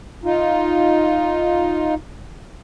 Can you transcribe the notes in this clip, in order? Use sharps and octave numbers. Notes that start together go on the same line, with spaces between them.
D#4 F4